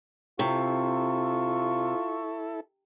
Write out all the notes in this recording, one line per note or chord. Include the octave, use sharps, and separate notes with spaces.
C3 E4 F4 A4 C#6